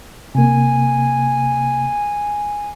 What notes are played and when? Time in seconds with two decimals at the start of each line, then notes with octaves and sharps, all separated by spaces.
0.35 C3 A#3 G#5